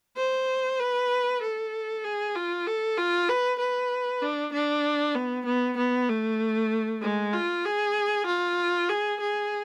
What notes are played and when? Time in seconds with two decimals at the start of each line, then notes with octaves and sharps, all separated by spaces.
0.17 C5
0.79 B4
1.42 A4
2.04 G#4
2.35 F4
2.67 A4
2.98 F4
3.29 B4
3.60 B4
4.22 D4
4.53 D4
5.15 B3
5.46 B3
5.78 B3
6.09 A3
7.02 G#3
7.33 F4
7.65 G#4
8.27 F4
8.89 G#4
9.21 G#4